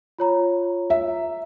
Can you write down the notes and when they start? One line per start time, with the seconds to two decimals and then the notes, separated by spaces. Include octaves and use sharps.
0.19 F4 C#5 A#5
0.90 E5